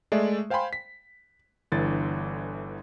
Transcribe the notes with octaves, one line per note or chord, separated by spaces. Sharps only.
G#3 A3 D5 E5
C5 F5 G5 G#5 B5 C6
B6
G1 D3 E3 A6